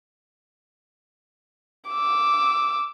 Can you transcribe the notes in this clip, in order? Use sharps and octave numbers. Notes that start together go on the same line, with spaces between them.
D6 E6